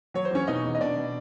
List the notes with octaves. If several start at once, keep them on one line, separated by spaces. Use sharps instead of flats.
F#3 C#5
C5
E2 C#4 C#5
B2 D#4 D#5
E2
D#5
B2 D4 D5
B2